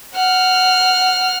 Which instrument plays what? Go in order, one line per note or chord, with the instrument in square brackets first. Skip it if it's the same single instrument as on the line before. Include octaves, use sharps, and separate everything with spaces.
[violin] F#5 F6